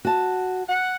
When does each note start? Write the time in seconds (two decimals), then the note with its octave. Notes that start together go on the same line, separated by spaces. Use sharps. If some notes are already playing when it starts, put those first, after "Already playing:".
0.05 F#4 A5
0.68 F#5